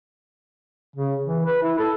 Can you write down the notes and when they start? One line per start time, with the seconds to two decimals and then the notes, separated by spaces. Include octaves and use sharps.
0.96 C#3
1.26 E3
1.46 B4
1.63 E4
1.79 A4